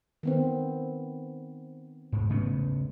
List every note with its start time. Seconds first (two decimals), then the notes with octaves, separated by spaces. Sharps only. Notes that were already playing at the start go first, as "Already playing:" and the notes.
0.23 D#3 B3 C4
2.12 G#2
2.30 C#3 A3 B3